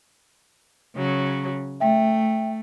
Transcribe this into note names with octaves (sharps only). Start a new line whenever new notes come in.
C#3 F#3
A3 E5 G5